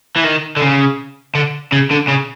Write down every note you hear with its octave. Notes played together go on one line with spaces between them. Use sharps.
E3
D#3
D3
C#3
D3
C#3
D3
C#3